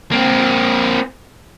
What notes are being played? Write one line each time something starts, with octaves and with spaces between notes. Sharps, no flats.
A#3 C4